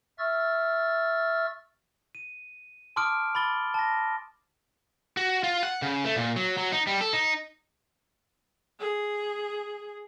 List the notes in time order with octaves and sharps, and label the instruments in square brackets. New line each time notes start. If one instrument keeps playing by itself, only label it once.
[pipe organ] E5 C#6 E6 F6 A6
[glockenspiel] D#7
A5 C6 D6 D#6 F6 D7
B5 D6 A6 G7
A5 A#6
[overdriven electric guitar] F#4
F4
F#5
C#3
A3
A#2
F#3
F#3
D#4
G3
A4
D#4
[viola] G#4